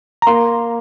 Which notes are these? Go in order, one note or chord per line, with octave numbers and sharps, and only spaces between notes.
A#5
A#3 C6